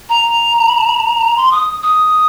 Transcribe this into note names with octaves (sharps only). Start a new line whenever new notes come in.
A#5
C6
D#6
D#6